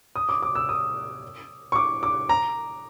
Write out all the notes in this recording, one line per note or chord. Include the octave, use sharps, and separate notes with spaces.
D#6
D6
D6
E6
D#6
C#6
D6
D6
A#5